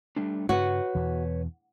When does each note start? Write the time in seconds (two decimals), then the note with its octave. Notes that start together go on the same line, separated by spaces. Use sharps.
0.16 G3 A3 D4
0.49 G2 C#3 F#4 B4 C#5
0.95 E2 B2 E3